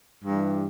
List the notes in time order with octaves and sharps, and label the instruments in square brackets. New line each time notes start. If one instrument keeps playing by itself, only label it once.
[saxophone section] G2 E3 G3